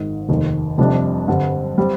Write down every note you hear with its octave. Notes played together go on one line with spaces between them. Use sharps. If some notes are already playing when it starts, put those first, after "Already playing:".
Already playing: G#1 G#2 D#3
F1 D#2 D#3
F1 F2 C3 G3 D4
G2 D3 G3 C4
G3 C4